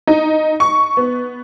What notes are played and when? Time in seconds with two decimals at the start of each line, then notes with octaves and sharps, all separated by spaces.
0.07 D#4
0.60 C#6
0.97 B3